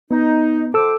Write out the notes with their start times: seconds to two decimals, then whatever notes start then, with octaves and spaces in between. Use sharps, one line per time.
0.11 B3 D#4
0.74 F2 A4 C5 D6 E6